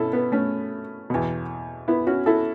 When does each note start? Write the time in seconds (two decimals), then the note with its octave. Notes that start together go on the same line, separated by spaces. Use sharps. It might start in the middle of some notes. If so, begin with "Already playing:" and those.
Already playing: B2 C#4 E4 A4
0.13 B3
0.32 A3 C#4
1.10 E2 B2
1.88 B3 E4
2.07 C#4 F#4
2.26 E4 A4